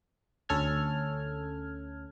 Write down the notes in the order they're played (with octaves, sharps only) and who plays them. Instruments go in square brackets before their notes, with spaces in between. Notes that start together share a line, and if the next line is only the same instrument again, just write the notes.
[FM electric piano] D2 C#4 A4 F6 G#6